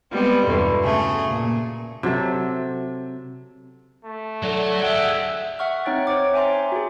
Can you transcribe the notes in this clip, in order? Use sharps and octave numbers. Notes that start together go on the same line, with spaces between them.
G3 G#3 B3 C4
E2 G2 B2 D3
C#3 A3 G#4
A#2
C3 F#3 A4 E5
A3
D3 F#3
G#4 E5 F#5 G5
E5 F#5 C#6 F6
C4 D#4 C#5 G5 F#6 A6
C5 C#5 D6
E5 G5 G#5 A#5 C6
F#4 G#4